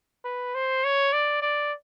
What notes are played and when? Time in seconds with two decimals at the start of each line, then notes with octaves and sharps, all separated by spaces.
0.25 B4
0.55 C5
0.84 C#5
1.13 D5
1.42 D5